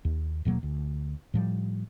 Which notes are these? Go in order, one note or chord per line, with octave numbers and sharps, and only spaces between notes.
D#2
D#1 B2 F#3 A#3
D2
A2 F3 G3